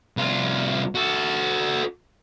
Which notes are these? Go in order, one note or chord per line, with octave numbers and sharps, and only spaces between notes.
C2 F4
F#4 A4